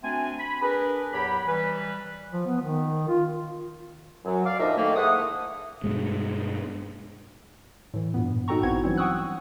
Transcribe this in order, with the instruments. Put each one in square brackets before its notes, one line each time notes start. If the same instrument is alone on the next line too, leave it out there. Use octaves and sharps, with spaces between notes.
[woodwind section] A3 C4 D4 F#4 G#5
B5
D4 G#4 A#4 B4
E2 A2 F#3 G4 B5
E3 G3 B4
[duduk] F3
B3
D#3
F4
[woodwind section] F#2 F#3
D5 F5
A#2 F3 D4 D#4 D#5 E5
D#3 A3 A#3
G#2 A3 E4 F#5 D#6
[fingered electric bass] G2 B2 G#3
[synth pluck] A2 E3
G2 A#2 B3
D#4 F#4 A4 G5 A#5 C#6
A1 B3 C4 E4 F#5 G#6
E3 F#3 G3 C4 C#4
F#5 G5 C#6 D#6 E6 F#6